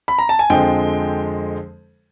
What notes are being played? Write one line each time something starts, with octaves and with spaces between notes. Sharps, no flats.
B5
A#5
A5
G#5
F2 D3 F3 G#3 G5